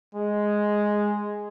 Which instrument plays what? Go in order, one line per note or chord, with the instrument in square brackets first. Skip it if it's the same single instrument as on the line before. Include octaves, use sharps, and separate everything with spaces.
[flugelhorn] G#3